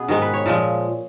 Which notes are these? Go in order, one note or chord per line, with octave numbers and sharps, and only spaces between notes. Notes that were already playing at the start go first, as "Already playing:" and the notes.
Already playing: B2 B3 C#4 G#4
G#2 D#3 G#3 F#4
B4
C#5
A#2 F3 G#3